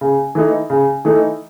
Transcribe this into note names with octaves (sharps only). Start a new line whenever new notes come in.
C#3
E3 A3 D#4
C#3
E3 A3 D#4